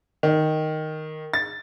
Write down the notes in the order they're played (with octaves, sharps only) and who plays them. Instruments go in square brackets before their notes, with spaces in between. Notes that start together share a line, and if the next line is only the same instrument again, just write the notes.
[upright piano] D#3
A6